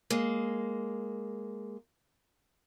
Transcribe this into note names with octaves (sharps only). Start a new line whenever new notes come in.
G#3 A#3